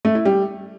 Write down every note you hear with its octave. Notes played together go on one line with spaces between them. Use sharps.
A3
E4
G3